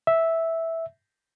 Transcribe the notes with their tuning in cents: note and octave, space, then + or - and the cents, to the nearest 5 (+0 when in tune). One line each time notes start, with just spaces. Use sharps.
E5 -5